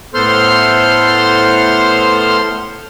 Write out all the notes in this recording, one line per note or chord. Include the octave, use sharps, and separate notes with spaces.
A2 B3 A4 C5 C6 F6